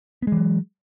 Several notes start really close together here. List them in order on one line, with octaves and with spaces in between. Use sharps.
B3 G#3 E3 F#3